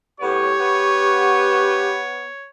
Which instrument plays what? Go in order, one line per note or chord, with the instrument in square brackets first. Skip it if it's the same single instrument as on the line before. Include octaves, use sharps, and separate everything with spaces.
[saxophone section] A2 B3 [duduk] G4 [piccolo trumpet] C#5 [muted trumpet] C#6
[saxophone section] B3